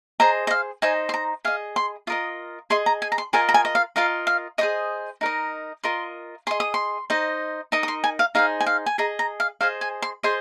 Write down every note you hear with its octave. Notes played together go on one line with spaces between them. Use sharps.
G#4 C5 D#5 A#5
D#5
F5
D#4 C5 D#5 G#5
C6
A#5
G#4 D#5 F5
C6
F4 A#4 D#5 D#6
G#4 D#5 C6
A#5
G#5
A#5
C6
F4 A#4 D#5 G#5
A#5
G#5
D#5
F5
F4 A#4 D#5 F5
F5
G#4 C5 D#5 D#6
D#4 A#4 D#5
F4 A#4 D#5 C6
G#4 D#5 C6
D#6
C6
D#4 C5 D#5
D#4 A#4 D#5 D#6
D#6
C6
G#5
F5
D#4 G#4 C5 F5
G#5
F5
G#5
G#4 D#5 A#5
A#5
F5
G#4 C5 D#5 F5
G#5
C6
G#4 C5 D#5 C6